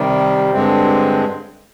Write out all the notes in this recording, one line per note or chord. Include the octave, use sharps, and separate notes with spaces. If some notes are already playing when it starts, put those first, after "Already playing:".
Already playing: C3 D#3 G3
G2 D3 G#3 C4